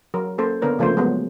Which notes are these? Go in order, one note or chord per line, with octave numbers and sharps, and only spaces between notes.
F#3 A#4
A#3 C#4 A4 C5
D3 B3 D4 A#4 B4 C#5
C#3 F3 A3 A#3 C5
F#3 G#3 A3 B3